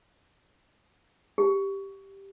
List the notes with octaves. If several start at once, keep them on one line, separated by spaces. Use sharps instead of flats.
G4